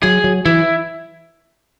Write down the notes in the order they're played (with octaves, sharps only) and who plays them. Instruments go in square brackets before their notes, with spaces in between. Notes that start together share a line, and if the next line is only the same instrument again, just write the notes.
[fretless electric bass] F#3 [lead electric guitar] G#4
[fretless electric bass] F#3
[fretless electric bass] E3 [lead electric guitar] E4